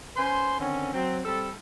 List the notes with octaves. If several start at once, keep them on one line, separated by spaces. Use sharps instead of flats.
C#4 B4 C5 C6
D3 D#3 C4 C#4
F#3 C4
G3 C4 A4